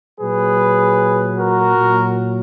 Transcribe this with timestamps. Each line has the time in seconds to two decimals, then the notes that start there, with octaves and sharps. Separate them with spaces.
0.20 A#2 F#3 G#4 B4
1.38 F#4 A#4
1.78 A#2 F#3